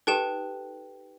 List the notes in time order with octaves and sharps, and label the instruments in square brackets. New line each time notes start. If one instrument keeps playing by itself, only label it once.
[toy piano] D#4 G4 A4 [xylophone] B4 G5 E7